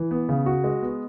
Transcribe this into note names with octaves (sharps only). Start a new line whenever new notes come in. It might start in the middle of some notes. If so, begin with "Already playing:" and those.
Already playing: E3
B3
C#3
F#4
G#3
B3